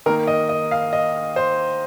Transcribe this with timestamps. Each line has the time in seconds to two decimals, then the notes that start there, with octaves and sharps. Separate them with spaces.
0.06 D#3 A#3 D#4 A#4
0.27 D#5
0.49 D#5
0.71 F5
0.93 D#5
1.36 C5